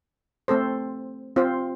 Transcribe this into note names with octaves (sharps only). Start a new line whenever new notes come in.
A3 C4 A4 C5
C4 F4 C5